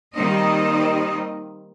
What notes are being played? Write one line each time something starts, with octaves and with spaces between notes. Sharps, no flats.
D#3 G3 A#3 C4 D#5